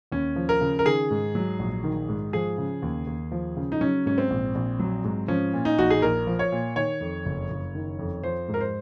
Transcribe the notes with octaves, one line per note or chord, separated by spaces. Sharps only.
D#2 C#4
F3
A#4
C#3
A#4
D#3 G#4
G#2
F#3
A#1
D#3
G#2
F3 G#4
C#3
D#2
D#2
F3
C#3
D#4
F#3 C#4
G#2 C#4
C4
A#1
A#1
F#3
G#2
F3 C#4
A#2
D#4
A#1 F#4
G#4
A#1 A#4
F3
C#5
A#2
D#3 C#5
F2
F#1
F#1
D#3
F2
F3 C5
G#2
A#4
C5